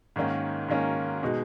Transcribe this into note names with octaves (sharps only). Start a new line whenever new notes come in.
G#2 D#3 A#3 C#4
G#2 D#3 A#3 C#4
B2 G#3 D#4